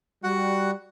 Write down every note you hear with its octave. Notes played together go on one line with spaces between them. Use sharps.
G3 F#4 F#5